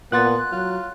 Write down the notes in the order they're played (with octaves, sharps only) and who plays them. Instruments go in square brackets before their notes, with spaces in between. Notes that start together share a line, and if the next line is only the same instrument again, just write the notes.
[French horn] A#2 [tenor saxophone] B3 [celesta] F#5 C6 A6 [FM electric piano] F#6
[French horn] F#3 [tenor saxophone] F4